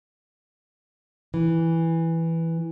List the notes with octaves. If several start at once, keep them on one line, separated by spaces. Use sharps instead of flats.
E3